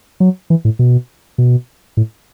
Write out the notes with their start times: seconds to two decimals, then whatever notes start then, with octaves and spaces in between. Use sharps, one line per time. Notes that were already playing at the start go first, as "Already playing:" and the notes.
0.20 F#3
0.50 E3
0.65 A2
0.79 B2
1.38 B2
1.97 A2